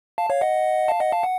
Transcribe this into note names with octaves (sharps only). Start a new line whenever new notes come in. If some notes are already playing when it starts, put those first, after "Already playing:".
F5 A5
C#5 F5
D#5 F#5
F5 A5
D#5 F#5
F5 A5
F#5